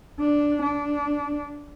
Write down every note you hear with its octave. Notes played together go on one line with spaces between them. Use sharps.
D4
D4